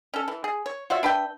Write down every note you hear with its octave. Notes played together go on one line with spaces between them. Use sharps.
C#4 A4
E3
G#4
C#5
F4 F#4 C#5 E5
D4 B4 E5 G5